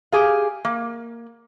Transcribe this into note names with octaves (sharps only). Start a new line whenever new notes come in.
G4 G#4 F5
A#3